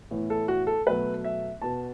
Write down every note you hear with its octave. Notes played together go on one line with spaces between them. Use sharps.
A2 E3 B3
A4
F#4
A4
B2 F#3 A3 B4
E5
B2 B3 A5